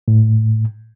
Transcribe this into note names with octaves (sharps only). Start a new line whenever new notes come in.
A2